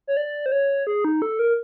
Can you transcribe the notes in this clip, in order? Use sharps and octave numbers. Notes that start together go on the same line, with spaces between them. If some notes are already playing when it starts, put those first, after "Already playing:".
C#5
D5
C5
C#5
G#4
D#4
A4
A#4